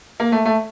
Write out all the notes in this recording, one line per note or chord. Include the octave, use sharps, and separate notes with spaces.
A#3
A3
A3